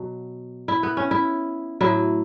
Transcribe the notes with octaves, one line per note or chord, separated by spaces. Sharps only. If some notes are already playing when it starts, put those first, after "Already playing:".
Already playing: B2 F#3
E4
B3
C#4
E4
A2 F#3 E4